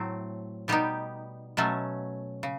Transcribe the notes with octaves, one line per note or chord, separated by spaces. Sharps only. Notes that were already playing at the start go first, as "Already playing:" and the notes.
Already playing: A2 F#3 A3 C4
B2 G3 B3 D#4 G4
B2 F#3 A3 C#4
C#3